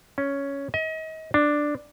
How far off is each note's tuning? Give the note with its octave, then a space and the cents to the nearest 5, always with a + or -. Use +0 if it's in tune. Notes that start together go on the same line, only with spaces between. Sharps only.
C#4 +5
D#5 +35
D4 +5